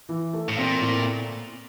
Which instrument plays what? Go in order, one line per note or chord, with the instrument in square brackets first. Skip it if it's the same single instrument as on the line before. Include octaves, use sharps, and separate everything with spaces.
[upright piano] E3
A3
[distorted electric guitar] A2
[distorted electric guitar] A#2 [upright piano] C4
[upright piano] A2